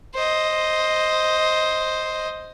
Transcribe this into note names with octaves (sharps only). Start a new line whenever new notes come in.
C5 D#5